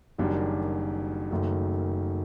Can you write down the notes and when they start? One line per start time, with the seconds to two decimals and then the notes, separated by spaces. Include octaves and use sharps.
0.18 F#1 F#2 D#3 G3 D4
1.31 F#1 F#2 D#3 A3